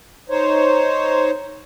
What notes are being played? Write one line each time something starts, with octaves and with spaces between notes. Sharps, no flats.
D#4 C5 C#5